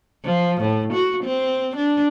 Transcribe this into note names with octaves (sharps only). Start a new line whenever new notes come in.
F3
A2
F#4
C4
D4